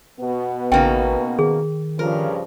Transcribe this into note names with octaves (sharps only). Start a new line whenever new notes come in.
B2 B3
A1 C#3 A#3 D#4 G5
D#3 G#4
G2 C#3 F3 A#4